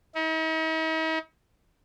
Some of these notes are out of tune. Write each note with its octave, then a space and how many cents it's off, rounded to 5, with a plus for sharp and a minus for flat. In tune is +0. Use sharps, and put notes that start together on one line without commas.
D#4 +45